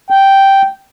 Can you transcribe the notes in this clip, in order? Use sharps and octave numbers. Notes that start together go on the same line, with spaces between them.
G5